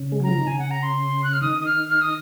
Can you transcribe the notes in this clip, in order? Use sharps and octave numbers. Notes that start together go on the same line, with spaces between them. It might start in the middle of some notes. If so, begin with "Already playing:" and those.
Already playing: C#3
G#3
F#3 A#5
F3
D#3
C#3 G#5
F#5
A#5
C6
F#6
F6
D#3 D#6
D#6
F6
F6
D#6